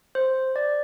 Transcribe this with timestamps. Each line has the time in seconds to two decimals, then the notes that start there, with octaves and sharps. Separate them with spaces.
0.15 C5
0.56 D5